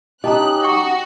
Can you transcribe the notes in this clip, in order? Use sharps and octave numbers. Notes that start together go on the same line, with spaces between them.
C#4 D#4 G4 D#5 A5 A#5 D#6 F#6
F#4 G5 C#6